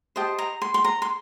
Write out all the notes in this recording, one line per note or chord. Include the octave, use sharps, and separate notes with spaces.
G4 C5 D#5 A5
A#5
C6
C6
A#5
C6